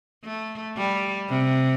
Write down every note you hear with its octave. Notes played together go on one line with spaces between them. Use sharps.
A3
G3
C3